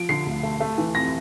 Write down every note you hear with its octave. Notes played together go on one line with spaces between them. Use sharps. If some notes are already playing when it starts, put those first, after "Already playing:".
Already playing: F3 D7
D3 C7
D2
A3
A3
E3
F2 A#6